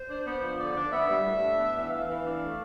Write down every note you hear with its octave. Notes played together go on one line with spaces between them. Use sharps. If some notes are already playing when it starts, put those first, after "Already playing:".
Already playing: C5
D4
B3
F3
D3 D5
D4
B3 E5
G3
A2
D4
B3
E3
E3 F5
E3
D4
A3